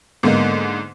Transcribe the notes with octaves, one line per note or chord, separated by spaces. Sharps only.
G#2 D3 A#3 B3 D#4